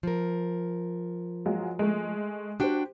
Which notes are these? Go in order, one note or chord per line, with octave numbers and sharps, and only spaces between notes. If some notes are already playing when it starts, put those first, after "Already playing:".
F3 A#4
F#3 G#3 F4
G#3 A3
D4 F#4 G4 C5 G5